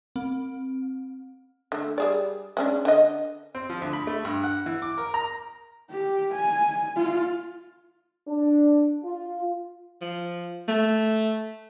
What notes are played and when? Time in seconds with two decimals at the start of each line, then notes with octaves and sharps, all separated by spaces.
0.16 C4
1.72 D3 A3
1.98 G3 G#4 D5
2.57 G#3 C#4 D4
2.85 D3 D#5
3.55 C4
3.70 F3
3.82 D2
3.93 B5
4.07 A3
4.25 G2
4.44 F#5
4.66 E3
4.82 D6
4.98 A#4
5.14 A#5
5.90 G4
6.34 G#5
6.96 F4
8.27 D4
9.02 F4
10.01 F3
10.68 A3